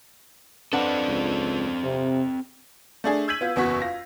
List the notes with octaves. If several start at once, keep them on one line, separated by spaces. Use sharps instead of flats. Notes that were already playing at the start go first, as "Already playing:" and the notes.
C4 D4 A4 B4 F#5
C#2
C3
A3 D4 G#4
E6 G6 G#6 B6 D#7 F#7
B3 F4
F#1 E2 B3 F#4 C#6 B6
F4 A#6